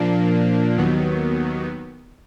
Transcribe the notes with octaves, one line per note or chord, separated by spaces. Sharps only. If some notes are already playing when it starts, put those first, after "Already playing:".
Already playing: A#2 F3 A#3 D4
D#2 D#3 F#3 B3